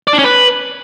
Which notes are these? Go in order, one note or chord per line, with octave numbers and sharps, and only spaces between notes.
D5
D4
C#4
B4